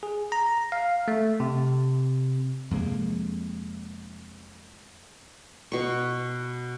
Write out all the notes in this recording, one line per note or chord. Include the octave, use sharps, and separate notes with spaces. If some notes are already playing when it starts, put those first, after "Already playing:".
G#4
A#5
F5
A3
C3
F2 C3 G#3 A#3
B2 C#6